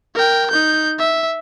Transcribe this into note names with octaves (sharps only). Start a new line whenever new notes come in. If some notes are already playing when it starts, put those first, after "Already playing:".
A#4 G5
D#4 G6
E5